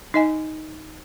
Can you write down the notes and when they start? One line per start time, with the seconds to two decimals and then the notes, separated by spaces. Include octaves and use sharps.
0.14 D#4 D#5 G#5